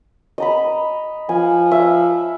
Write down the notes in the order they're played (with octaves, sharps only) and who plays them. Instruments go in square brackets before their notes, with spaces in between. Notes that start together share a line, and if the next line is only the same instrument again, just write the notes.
[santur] D#5 A#5 B5
[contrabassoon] F3 [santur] G#5
[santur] E5